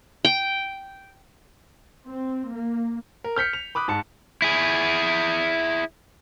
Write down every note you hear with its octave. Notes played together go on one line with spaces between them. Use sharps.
G5
C4
A#3
A#4
F6 G6 B6 C#7
F7
B5 D6 D#6 F#6
G#2 A5 C#7
E4 G#4